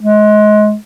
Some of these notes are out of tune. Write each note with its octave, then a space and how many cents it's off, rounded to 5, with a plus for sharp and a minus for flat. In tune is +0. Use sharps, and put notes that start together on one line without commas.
G#3 +25